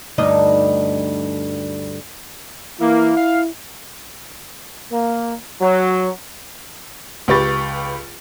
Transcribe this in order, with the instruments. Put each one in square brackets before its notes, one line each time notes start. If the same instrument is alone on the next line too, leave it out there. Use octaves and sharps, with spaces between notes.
[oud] D2 G2 D#4
[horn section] E3 A#3 [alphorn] E4
[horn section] F5
[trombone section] A#3
F#3
[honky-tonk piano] C#2 G4 B4 C#6 A6